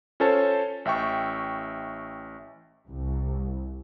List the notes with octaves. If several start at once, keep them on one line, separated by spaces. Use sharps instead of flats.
C#4 F4 A4 C5 C#5 A5
A1 E5 G5 C#6
C2